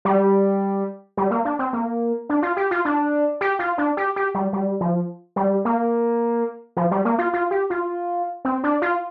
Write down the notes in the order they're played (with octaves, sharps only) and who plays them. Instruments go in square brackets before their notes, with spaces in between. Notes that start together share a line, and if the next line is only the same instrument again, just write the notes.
[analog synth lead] G3
G3
A#3
D4
C4
A#3
D4
F4
G4
F4
D4
G4
F4
D4
G4
G4
G3
G3
F3
G3
A#3
F3
G3
A#3
F4
F4
G4
F4
C4
D4
F4